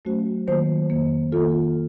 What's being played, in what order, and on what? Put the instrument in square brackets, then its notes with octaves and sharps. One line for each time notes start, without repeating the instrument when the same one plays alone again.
[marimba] F#3 A3 C#4 F#4 C5
D#3 F#3 A#3 F4 C5
F2 D#3 A#3
D#3 A#3 F4 A4